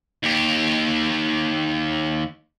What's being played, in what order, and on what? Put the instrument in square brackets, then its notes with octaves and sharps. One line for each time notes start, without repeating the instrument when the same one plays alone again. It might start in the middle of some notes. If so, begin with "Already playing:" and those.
[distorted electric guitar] D#2 G4